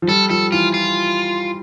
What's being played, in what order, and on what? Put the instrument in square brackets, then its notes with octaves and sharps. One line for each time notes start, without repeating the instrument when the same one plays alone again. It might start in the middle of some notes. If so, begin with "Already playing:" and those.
[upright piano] F3
[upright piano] G3 [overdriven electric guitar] A4
[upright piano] F3 [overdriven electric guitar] A4
[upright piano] E3 [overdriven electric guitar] F4
[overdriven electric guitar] F4